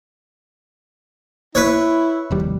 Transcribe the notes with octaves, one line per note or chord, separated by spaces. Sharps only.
E4 B4 C#5
F1 D#2 G3